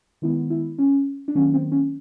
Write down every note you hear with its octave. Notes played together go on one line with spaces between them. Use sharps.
D#3 G#3 B3 E4
E4
C#4
D4
D#3 F#3 A#3 C#4
C4
C#4